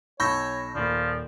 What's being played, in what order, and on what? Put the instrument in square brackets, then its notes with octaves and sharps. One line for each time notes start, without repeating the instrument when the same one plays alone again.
[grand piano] B1 E6 G6 [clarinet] C#5 [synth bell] B5 C#6 A#6
[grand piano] D#1 A#3 [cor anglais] F3 [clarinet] D5